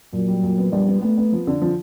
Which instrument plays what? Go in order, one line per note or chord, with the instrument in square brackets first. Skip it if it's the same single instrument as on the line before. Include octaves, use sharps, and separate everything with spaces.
[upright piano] A#2 [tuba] F#3
[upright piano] G3
A#2
B3
[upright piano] A#1 [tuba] G3
[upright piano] B3
[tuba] A3 [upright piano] B3
[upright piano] B3
F3
D3
F3